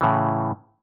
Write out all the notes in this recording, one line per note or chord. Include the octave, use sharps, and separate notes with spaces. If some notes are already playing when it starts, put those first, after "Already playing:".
A2 C#3 E3